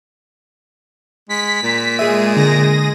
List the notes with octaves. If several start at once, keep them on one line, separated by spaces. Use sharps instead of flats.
G#3 B6
A#2
G#3 G#4 E5 D#7
D3 A#6